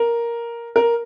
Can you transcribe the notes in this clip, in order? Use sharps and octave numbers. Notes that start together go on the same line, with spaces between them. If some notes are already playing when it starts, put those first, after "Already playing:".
Already playing: A#4
A#4